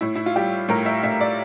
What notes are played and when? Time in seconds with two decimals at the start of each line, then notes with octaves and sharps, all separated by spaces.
0.01 A2 E4
0.16 E4
0.26 F4
0.36 G3 G4
0.68 A2 A#4
0.86 E5
1.03 A2 E5
1.21 D5